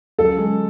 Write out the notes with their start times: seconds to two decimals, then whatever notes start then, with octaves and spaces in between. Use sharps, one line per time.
0.18 F#2 A4
0.38 G#3